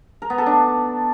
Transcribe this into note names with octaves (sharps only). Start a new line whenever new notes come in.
A#4
B3
A4
D4